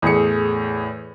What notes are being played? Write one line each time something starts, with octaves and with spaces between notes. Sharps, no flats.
E2 A2 G#4 C#7